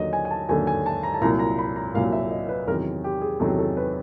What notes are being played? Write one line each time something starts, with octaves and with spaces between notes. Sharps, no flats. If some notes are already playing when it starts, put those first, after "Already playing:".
Already playing: D#2 D3 F#3 D#5
G#5
G#5
A5
D#2 D3 F#3 G#5
G#5
A5
A#5
A5
C2 A#2 F#3 A#5
A#5
B5
A#5
C2 A#2 F#3 F5
E5
D#5
B4
E2 C3 D#3 F#3 A#4
G4
G#4
E2 C3 D#3 F#3 A4
A4
B4